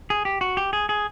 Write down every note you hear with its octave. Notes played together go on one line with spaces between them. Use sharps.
G#4
G4
F#4
G4
G#4
G#4